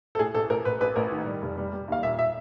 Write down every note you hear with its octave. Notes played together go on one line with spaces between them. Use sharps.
A4
A2 G#4
A1 A4
A1 A#4
A1 B4
A1 B4
A1 A#4
D#3
G3
F1
G3
G3
D#2 F5
A#2 E5
E5